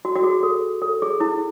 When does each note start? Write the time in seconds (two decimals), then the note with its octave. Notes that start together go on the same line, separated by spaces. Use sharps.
0.05 F#4
0.16 F#4
0.24 G#4
0.43 A4
0.82 A4
1.02 G#4
1.20 E4